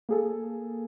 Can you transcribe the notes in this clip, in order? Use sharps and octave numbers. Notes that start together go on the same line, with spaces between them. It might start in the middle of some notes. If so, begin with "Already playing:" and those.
A#3 G#4 A4